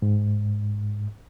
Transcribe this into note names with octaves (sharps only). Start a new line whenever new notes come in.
G#2